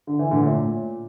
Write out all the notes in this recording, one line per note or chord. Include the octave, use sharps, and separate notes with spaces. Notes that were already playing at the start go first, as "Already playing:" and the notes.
D3
E3
A#2 D3
A2
A#2